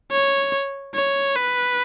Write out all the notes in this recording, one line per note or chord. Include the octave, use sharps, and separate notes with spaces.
C#5
C#5
B4